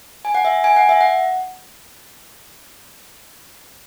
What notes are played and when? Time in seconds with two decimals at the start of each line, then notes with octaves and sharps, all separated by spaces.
0.25 G#5
0.35 F#5
0.45 E5
0.64 G#5
0.76 F#5
0.89 E5
1.01 F#5